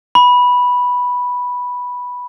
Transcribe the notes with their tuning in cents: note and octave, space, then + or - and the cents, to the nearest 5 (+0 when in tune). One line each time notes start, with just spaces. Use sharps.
B5 -5